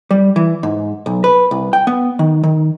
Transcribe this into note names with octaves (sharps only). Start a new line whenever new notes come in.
G3
E3
G#2
B1
B4
C2
G5
B3
D#3
D#3